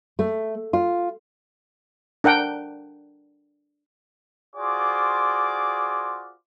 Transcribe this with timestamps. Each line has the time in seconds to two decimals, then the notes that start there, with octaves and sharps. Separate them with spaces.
0.19 A3
0.73 F4
2.24 D4 A#4 F#5 G5
4.56 F4 F#4 G#4 C5 D5 D6